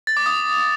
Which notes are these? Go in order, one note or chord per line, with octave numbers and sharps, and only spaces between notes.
A6
D6
D#6